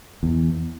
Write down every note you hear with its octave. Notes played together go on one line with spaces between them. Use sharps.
E2